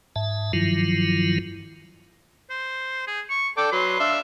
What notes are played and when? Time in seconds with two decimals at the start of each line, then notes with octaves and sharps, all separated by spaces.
0.16 G#2 E5 A5
0.53 G2 D#3 F3 F#3 E4 F4
2.50 C5
3.07 G#4
3.30 C#6
3.57 A4 D5 G5 D6
3.72 F#3 B4 C6
4.00 D4 E5 F5